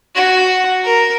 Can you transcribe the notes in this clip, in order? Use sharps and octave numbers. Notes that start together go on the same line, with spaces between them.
F#4
A#4